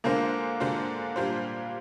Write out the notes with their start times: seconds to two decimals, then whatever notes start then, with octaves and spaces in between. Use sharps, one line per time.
0.04 D3 G#3 A#3 D4 F4 C5
0.60 D3 G#3 D4 F4 C5
1.16 A#2 G3 D4 F4 C5